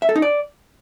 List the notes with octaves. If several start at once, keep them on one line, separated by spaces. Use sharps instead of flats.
E5
A4
D#4
D5